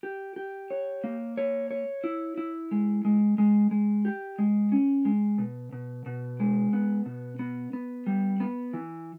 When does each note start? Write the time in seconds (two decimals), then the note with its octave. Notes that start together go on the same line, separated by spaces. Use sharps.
0.03 G4
0.36 G4
0.71 C#5
1.04 A#3
1.37 C#5
1.71 C#5
2.04 E4
2.38 E4
2.71 G#3
3.05 G#3
3.38 G#3
3.71 G#3
4.05 G4
4.39 G#3
4.72 C#4
5.05 G#3
5.38 B2
5.73 B2
6.06 B2
6.40 G#3
6.73 B3
7.06 B2
7.39 B3
7.73 B3
8.07 G3
8.40 B3
8.73 E3